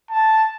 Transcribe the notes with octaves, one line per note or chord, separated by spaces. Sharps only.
A5